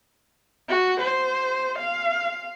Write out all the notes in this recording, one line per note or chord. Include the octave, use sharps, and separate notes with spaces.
F#4
C5
F5